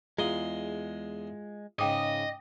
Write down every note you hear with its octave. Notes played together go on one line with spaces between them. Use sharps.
E2 G#3 F4 F5 C6 D#6 F#7
G#2 C#3 D#5 G5 D6 D#6